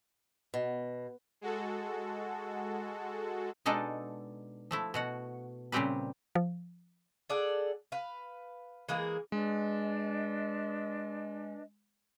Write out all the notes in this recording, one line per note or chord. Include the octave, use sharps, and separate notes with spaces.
B2
G#3 F#4 A4
B2 G#3 D4 D#4 A4
F3 A3 E4
B2 F#4 F#5
A#2 C#3 G3 C4 G4 B4
F3
G#4 A4 D5 F#5
B4 F5
E3 G#3 A#3 G#4
G#3 D4 B4 D#5